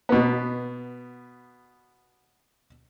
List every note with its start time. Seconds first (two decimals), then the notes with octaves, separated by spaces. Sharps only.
0.09 B2 B3